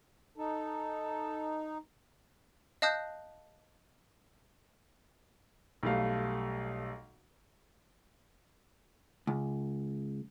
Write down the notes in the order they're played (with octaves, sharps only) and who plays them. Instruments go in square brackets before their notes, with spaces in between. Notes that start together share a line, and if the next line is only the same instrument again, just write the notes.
[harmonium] D#4 [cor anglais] A4
[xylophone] D#5 F5 A5 D#6 F#6 G6
[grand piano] B1 G3 A3 F5
[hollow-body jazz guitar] C#2